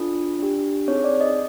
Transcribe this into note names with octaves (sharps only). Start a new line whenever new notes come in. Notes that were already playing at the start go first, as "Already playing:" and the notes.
Already playing: D4 F4 A4
D4 G4
C4 D#4 G#4 C#5
D5
D#5